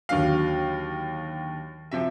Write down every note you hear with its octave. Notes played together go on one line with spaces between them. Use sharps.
D#2 D3 F#3 F5
C3 F3 E5